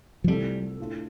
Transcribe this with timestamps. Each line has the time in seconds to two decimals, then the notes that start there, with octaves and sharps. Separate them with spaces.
0.24 F3
0.28 C2 C3 G3 A3 F4 A4
0.78 A2 A3 D4 F4 A4